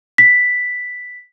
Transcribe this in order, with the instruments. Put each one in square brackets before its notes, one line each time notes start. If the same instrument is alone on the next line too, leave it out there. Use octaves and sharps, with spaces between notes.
[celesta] B6